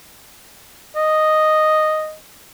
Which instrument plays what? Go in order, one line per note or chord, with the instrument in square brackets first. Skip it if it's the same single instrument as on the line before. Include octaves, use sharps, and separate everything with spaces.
[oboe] D#5